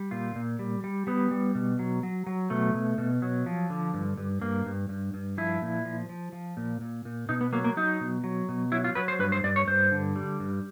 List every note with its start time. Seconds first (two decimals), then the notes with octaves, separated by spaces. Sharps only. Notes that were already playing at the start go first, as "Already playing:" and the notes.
Already playing: G3
0.11 A#2 F4
0.36 A#2
0.59 G3
0.84 G3
1.07 G3 B3
1.31 G3
1.55 B2
1.79 F#3
2.03 F#3
2.27 F#3
2.50 B2 A3
2.74 B2
2.98 B2
3.22 F#3
3.46 F3
3.70 D3
3.94 G2
4.17 G2
4.42 G2 A#3
4.66 G2
4.89 G2
5.14 G2
5.38 F3 E4
5.62 A#2
5.85 F3
6.09 F3
6.33 F3
6.57 A#2
6.81 A#2
7.05 A#2
7.29 B2 D#4
7.41 B3
7.53 F#3 A#3
7.64 A#3
7.77 F#3 D#4
8.01 B2
8.24 F#3
8.49 B2
8.72 F#3 E4
8.84 F4
8.95 F#3 B4
9.08 C5
9.19 G2 B4
9.32 C5
9.44 G2 D5
9.56 C#5
9.67 G2 C5
9.92 D3
10.16 G3
10.40 G2